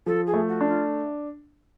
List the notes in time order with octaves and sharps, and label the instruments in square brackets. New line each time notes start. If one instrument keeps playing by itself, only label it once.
[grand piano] F3 [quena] A4
[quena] G#4
[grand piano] A3
[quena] F#4
[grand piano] D4
[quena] F4